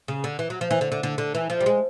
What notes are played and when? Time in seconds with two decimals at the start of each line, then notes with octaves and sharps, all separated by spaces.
0.08 C#3
0.24 D3
0.39 E3
0.50 F#3
0.61 F3
0.71 E3
0.81 D3
0.92 D3
1.03 D3
1.18 D3
1.35 E3
1.50 F3
1.61 G3
1.66 G#3